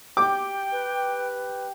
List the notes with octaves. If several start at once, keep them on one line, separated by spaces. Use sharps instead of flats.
G4 G5 D6
B4